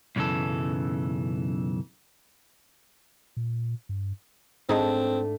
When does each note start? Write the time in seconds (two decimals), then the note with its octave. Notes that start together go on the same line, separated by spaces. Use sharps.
0.16 B1 F#2 C#3 E3 A4
3.37 A#2
3.89 G2
4.69 G#2 A3 C4 D4 D#4 G#4 D#5